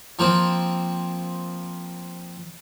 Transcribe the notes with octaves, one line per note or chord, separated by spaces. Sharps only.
F3 A#3 C4